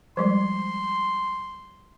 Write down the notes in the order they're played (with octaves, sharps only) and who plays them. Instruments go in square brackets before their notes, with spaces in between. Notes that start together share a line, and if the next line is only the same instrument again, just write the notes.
[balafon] F3 G3 G#3 [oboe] C6